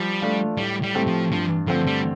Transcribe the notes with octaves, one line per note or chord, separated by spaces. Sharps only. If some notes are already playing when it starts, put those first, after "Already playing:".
Already playing: F3 G3
A3 D4 F4
A2 G3
G3
A3 C4 G4
F3
G2 F3
D3 F3 A3 C4
G3